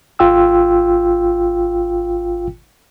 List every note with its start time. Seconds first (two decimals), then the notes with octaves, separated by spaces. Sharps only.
0.19 G#1 F4 G5 E6